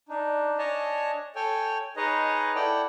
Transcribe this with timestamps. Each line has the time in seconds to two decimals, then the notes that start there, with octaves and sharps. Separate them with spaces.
0.09 D4 D#4
0.58 D4 C#5 D#5 G#5 A5
1.35 A4 C#5 G5 G#5
1.97 D#4 G#4 B4 C#5 D#5
2.55 E4 A4 D5 F#5 G5